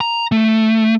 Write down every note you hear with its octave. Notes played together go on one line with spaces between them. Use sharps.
A#5
A3